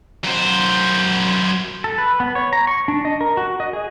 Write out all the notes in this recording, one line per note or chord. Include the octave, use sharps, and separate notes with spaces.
F#2 C5
A4
B4
B3
C#5
A#5
C#6
D4
D#5
A#4
F#4
D#5
G#4